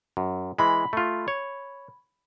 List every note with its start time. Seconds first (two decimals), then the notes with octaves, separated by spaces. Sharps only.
0.17 F#2
0.58 E3 G#3 B5
0.93 A3 F4
1.28 C#5